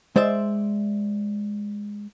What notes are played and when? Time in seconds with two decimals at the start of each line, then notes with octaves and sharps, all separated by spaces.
0.16 G#3 C5 D5 E5